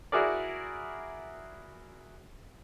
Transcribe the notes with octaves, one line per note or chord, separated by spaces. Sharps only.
E4 F#4 G#4 A#4 D5